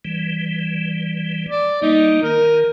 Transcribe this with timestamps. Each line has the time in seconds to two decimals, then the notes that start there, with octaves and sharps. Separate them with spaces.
0.05 E3 G3
1.49 D5
1.82 G3 A#3 D#4
2.23 D#3 A#4